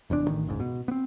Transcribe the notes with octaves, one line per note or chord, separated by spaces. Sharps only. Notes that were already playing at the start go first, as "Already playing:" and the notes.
F1 E2 G2 D4
A1 D#3
F#1 C#2 G#2
B2
B3 C4